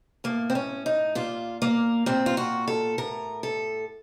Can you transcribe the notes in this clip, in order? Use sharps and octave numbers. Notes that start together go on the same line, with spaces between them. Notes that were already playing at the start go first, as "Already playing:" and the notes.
A2 A#3
C4
C#4
D#4
A#2 F4
A#3
A#2 C4
F4
F#4
A4
A2 A#4
A4